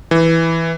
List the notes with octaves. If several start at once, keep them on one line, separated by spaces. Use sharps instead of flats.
E3